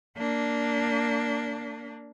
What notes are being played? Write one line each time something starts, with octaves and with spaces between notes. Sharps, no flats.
A#3 D4